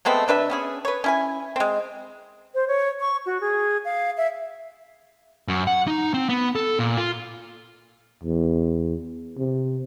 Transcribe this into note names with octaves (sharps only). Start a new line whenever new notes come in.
G#3 A3 B3 C4
C3 D4 B4 E5
B3 C#4 G#4
B4 C#5
C#4 E4 G#5
G#3 C4
C5
C#5
C#6
F#4
G#4
F5
E5
F#2
F#5
D#4
C4
B3
A4
A#2
F4
E2
C3